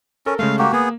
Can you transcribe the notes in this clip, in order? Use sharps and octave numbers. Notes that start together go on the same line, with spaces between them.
C#4 A4 A#4
C#3 G#3 A3 F5
A#3 F#4 G4
A#3 B3 G#4